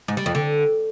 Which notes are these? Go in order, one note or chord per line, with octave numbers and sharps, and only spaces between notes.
G#2
G3
F2
D3